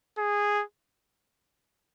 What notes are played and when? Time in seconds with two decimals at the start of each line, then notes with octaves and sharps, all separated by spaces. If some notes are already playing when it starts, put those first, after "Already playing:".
0.18 G#4